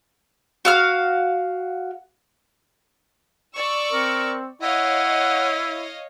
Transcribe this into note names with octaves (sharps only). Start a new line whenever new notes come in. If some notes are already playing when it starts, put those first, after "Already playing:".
F#4 F5 F6
D5 C#6 E6
C4 A#4
E4 C#5 D#5 F5 F#5